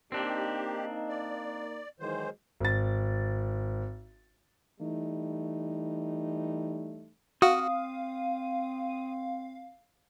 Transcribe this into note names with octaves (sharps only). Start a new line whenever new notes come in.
A#3 C4 D4 D#4 G4
D5
D#3 E3 F#3 G#3 C5
G#1 A6
E3 G3 A3 D#4
C4 F#4 F5 D#6